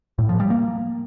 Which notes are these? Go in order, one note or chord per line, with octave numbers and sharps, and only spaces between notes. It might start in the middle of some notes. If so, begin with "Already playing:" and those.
A2
F3
G3
A#3